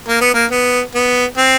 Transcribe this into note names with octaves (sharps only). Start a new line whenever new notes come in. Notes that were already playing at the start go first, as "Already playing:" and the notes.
A#3
B3
A#3
B3
B3
C4